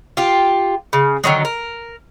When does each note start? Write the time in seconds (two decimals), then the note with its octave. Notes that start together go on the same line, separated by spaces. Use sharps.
0.17 F4 G4
0.93 C#3
1.24 D3 D#3 F#3 G#3
1.45 A#4